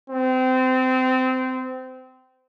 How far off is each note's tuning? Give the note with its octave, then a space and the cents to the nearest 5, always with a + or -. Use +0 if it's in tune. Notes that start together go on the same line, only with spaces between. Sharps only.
C4 -25